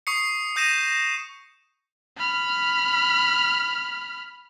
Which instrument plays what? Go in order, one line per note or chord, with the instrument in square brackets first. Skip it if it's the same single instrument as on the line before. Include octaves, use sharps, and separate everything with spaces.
[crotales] C#6 D#6 C7 C#7
D#6 G6 A#6 D#7 E7
[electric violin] B5 F6